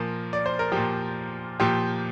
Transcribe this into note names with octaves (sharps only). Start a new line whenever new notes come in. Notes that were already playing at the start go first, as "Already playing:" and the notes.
Already playing: A#2 F3 A#4
D5
C5
A#4
A#2 F3 G4
A#2 F3 G4